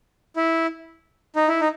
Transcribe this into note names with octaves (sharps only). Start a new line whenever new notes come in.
E4
D#4
E4
D#4